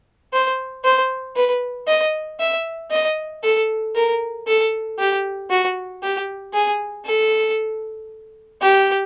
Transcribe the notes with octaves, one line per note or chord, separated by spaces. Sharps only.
C5
C5
B4
D#5
E5
D#5
A4
A#4
A4
G4
F#4
G4
G#4
A4
G4